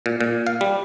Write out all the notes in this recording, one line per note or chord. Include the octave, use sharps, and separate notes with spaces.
A#2
A#2
F5
G3